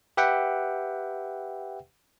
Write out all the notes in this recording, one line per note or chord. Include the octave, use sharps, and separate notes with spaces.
G4 B4 E5 F#5 G5